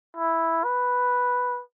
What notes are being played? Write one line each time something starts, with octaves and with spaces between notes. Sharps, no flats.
E4
B4